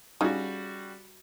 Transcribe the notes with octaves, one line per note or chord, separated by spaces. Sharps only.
C#3 G3 D#4 F#4